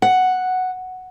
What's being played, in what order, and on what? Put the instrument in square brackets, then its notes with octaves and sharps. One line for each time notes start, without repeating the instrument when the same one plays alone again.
[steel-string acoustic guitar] F#5